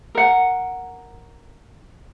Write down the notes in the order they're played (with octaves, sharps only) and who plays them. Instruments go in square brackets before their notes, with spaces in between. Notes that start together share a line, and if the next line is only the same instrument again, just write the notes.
[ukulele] A#4 F#5